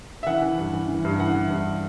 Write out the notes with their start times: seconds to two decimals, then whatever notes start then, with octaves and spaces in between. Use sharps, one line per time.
0.23 E5
0.26 E3 F#5
0.42 E3
0.58 G2
0.73 E3
0.89 E3
1.05 G2
1.20 E3 F#5
1.35 E3
1.50 G2